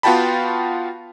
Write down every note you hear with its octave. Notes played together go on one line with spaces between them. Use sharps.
B3 F4 F#4 G5 A5 B5